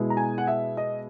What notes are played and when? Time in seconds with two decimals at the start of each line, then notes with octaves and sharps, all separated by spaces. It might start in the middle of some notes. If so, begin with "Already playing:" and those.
Already playing: B2 G#3 B3 E4
0.10 A#5
0.17 G#5
0.38 F#5
0.47 E5
0.77 D#5